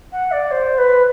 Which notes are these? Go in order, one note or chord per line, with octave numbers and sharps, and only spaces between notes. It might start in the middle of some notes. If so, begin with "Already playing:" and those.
F#5
D5
C5
B4